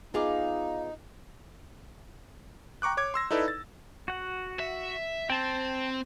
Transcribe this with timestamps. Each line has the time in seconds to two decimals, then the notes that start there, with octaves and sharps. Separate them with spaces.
0.14 B3 D#4 F4 G#4 D#5 F5 D6
2.82 G5 A#5 C#6 D6 F#6
2.97 C#5 D6 G#6
3.14 C6 E6 A#6
3.31 D#4 E4 A4 B4 D5
3.48 A6
4.08 F#4 F#5
4.60 E5
5.30 C4 G5 A5